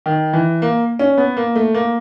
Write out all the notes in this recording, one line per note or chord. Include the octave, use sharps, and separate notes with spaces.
D#3
E3
A#3
C#4
B3
A#3
A3
A#3